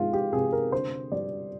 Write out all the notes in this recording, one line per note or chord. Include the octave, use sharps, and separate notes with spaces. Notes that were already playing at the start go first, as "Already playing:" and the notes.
Already playing: D#3 G#3 F4
G4
C3 G#4
A#4
D3 C5
G3 D5